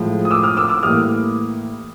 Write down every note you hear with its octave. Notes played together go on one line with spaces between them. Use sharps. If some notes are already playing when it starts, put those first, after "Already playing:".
Already playing: A2 F3 G#3
D#6
D6 E6
D#6 F6
D6 E6
D6 E6
A2 E3 G3 A#3 D#6 F6